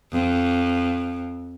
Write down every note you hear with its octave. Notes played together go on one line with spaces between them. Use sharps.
F2